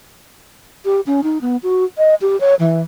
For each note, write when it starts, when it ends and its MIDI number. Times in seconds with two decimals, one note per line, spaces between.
0.85 1.01 67
1.07 1.23 61
1.24 1.38 63
1.41 1.57 59
1.63 1.84 66
1.98 2.14 75
2.22 2.39 67
2.41 2.55 73
2.59 2.82 52